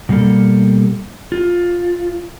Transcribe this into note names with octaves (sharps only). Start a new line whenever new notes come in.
B2 G3 A#3 A4
F4